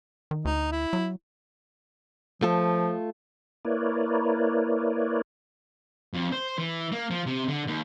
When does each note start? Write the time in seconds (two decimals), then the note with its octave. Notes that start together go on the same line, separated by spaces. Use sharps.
0.31 D#3
0.45 D2 D#4
0.72 E4
0.93 F#3
2.43 F3 A3 F4 A4
3.65 A#3 E4 A#4 B4 C#5 D5
6.14 F2
6.32 C5
6.58 E3
6.92 A#3
7.11 F3
7.26 C3
7.48 D3
7.67 D#2